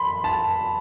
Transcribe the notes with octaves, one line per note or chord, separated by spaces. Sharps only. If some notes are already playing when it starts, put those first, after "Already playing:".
Already playing: B5 C6
A5